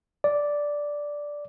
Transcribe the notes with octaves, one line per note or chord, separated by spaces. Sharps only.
D5